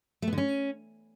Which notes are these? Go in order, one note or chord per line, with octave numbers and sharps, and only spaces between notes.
A3
B3
D3
C#4